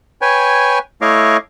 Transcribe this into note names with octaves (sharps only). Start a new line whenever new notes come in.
B4 C#5 G5 G#5
A3 E4 C#5 D#5 F5 D6